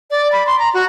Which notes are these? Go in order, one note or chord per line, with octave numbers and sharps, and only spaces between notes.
D5
B5
C6
A#5
F#4